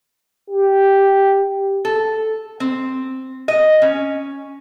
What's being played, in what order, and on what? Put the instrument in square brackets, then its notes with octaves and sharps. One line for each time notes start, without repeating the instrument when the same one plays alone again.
[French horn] G4
[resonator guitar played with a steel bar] A4
C4
D#5
C#4